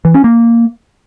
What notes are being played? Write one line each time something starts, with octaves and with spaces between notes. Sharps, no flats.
E3
C#4
A#3